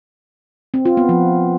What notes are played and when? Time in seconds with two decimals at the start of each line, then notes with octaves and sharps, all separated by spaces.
0.74 C4
0.85 F4
0.97 B3
1.09 F3